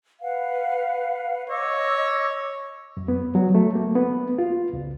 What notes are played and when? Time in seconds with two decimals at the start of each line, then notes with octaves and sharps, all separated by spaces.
0.21 B4 F5 F#5
1.49 C#5 D#5 D6 E6
2.97 F#2
3.08 B3
3.35 F#3
3.55 A3
3.75 A#3
3.95 B3
4.38 F4
4.73 C#2